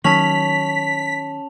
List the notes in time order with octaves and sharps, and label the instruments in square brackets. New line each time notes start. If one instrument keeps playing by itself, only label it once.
[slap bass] D#3 F#3 [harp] C#4 [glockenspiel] A5 F7 F#7 [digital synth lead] B6